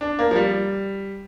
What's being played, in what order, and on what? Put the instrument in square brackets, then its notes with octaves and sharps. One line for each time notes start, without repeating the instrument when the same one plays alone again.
[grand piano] D4
A#3
F3
G3